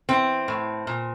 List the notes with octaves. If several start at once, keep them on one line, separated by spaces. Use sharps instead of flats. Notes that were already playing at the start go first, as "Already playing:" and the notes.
E3 C4
A2
A#2